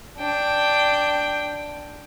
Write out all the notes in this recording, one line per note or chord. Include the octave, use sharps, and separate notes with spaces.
D4 G5